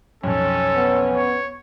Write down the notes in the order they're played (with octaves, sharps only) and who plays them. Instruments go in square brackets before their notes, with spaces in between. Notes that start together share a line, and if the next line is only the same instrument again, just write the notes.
[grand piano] B1 F2 [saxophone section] C#4 [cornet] A4
[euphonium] B3
[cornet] C#5